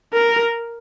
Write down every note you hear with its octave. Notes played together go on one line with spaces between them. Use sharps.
A#4